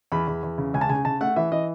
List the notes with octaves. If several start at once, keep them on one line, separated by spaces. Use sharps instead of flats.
E2 B5
E2
E2
C#3
C#2 G#5
A5
C#3 G#5
C#3 A5
A3 F#5
E3 E5
E3 D#5